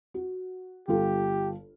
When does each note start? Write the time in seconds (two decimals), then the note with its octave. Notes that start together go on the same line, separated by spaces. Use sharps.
0.14 F#4
0.88 G1 F4 G4 A4